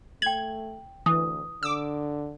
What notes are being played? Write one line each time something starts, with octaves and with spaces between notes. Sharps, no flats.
A3 G5 G#6 F#7
D2 E3 D#6
D3 D6 E6